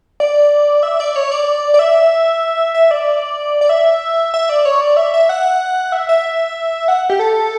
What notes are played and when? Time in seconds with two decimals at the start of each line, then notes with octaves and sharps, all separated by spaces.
0.20 D5
0.83 E5
1.00 D5
1.16 C#5
1.32 D5
1.74 D5
1.79 E5
2.75 E5
2.91 D5
3.61 D5
3.69 E5
4.34 E5
4.49 D5
4.65 C#5
4.81 D5
4.97 E5
5.14 E5
5.29 F#5
5.92 E5
6.09 E5
6.88 F#5
7.10 G4
7.19 A4